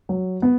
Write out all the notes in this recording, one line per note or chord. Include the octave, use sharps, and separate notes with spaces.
F#3
B3